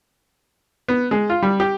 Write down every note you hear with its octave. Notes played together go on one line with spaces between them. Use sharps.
B3
G#3
F4
G3
G4